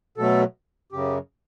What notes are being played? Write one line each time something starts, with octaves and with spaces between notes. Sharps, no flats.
B2 F#3 A3 A4
F#2 C#3 F#3 G4